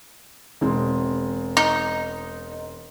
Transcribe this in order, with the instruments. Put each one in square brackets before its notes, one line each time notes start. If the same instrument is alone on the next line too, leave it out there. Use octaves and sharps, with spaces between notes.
[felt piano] E1 G#3 C4
[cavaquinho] D#4